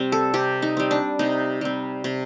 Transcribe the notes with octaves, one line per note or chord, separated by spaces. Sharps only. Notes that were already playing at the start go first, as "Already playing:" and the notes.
Already playing: C3 G3 C4
A4
C3 G4
D#4
G3 C4
D4
C3 D#4
G3 C4
C3